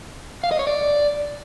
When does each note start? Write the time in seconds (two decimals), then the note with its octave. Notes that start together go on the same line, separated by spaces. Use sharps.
0.44 F5
0.51 D#5
0.59 C#5
0.67 D5